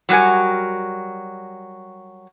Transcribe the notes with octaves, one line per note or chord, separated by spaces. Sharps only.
F#3 G3 F#4 A#4 G#5